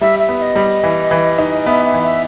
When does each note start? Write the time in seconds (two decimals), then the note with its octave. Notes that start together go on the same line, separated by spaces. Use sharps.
0.01 G3 E5
0.19 E5
0.29 B3
0.38 E5
0.42 D#5
0.56 G3
0.83 E3
1.11 E3
1.38 D#4
1.66 B3 E5
1.85 E5
1.94 E3
2.03 E5